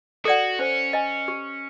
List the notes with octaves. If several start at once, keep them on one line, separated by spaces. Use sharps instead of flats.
F#4 A4 D5 F#5
C#4 C5
D#5 G#5
G4